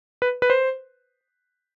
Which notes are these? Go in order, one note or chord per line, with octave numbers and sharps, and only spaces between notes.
B4
B4
C5